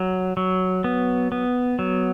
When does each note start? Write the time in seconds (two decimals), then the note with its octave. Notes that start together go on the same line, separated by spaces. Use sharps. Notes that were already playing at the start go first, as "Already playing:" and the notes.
Already playing: F#3
0.37 F#3
0.84 B3
1.32 B3
1.79 F#3